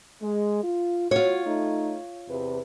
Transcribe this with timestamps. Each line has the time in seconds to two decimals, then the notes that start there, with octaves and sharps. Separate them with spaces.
0.22 G#3
0.64 F4
1.11 F4 F#4 C#5
1.46 A3 D#4
2.29 E2 C3 B4